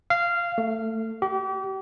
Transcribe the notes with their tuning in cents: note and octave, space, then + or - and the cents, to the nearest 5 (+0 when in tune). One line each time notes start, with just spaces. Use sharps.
F5 -15
A3 +20
G4 -35